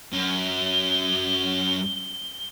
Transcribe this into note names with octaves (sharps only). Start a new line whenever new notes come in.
F#2 G7